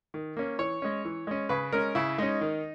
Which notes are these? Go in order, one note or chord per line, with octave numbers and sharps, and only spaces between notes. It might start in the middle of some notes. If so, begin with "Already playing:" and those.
D#3
A#3 C#4
E3 C#5
G#3 C#4
E3
G#3 C#4
C#3 B4
G#3 C#4 A#4
C#3 E4
G#3 C#4 D#4
D#3